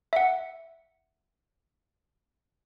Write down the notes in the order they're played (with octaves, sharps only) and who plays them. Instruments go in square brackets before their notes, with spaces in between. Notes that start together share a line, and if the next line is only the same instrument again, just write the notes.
[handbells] E5 F#5